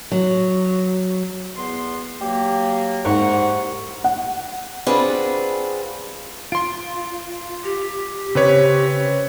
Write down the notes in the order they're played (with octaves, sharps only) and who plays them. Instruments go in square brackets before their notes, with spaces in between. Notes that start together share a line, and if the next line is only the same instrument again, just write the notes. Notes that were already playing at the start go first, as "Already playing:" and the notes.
[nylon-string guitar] F#3
[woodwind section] E2 B3 C6
[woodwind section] F#3 A#3 [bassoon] G4
[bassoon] C2 [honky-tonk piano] G#2 [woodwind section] F#5 C#6
[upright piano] F#5
[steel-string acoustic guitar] C4 D4 F4 F#4 G#4 B4
[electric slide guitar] F4 [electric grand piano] C6 D7
[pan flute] G4
[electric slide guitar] C#3 [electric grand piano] C4 B4 C#5